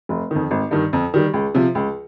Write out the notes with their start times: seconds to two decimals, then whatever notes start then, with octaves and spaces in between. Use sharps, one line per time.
0.09 F1
0.31 F2 D#3
0.51 G#1
0.71 G2 D#3
0.93 F2
1.14 D#3 G3
1.34 C#2
1.54 C3 F3
1.75 C#2